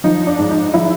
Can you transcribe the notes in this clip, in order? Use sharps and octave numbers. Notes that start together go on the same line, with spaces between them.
F3 D#4
D4
G#2
D#4
F3 E4